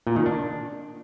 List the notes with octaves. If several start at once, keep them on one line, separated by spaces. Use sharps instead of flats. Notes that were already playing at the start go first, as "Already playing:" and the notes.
A#2
D#3
D4